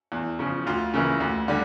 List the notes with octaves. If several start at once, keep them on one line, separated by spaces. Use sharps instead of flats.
E2
C#3 F3
D2 F4
C#3 E3 A#3 E4
D2
D3 G3